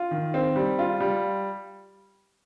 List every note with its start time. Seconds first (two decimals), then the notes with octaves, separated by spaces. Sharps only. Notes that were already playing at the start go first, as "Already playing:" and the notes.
Already playing: F4
0.11 D#3
0.34 C4
0.56 G3
0.79 F4
1.00 G3